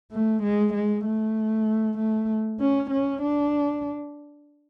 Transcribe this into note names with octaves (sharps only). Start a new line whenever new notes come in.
A3
G#3
G#3
A3
A3
C#4
C#4
D4